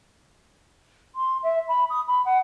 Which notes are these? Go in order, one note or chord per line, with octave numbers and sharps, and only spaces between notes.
C6
E5
B5
D#6
B5
F#5